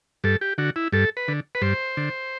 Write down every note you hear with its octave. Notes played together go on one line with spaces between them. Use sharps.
G2 A4
G4
D3 F#4
E4
G2 A4
B4
D3
B4
G2 C5
D3